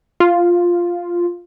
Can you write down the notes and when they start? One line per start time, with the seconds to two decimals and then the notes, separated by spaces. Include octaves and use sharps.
0.20 F4